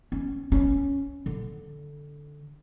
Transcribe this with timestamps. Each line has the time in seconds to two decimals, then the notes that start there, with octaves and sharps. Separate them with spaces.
0.12 C#4
0.52 C#4
1.26 D3